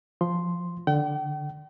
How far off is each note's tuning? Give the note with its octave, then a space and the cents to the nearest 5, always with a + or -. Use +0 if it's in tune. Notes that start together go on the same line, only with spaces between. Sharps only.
F3 +0 C6 +0
D3 +0 G5 -40